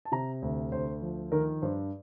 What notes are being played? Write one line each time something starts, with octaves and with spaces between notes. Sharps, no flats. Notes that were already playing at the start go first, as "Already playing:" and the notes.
A5
C3 A#5
D2
D2 C5
F3
D#3 A#4
G2 C5